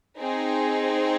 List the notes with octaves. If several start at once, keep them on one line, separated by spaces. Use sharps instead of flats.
C4 D#4 G#4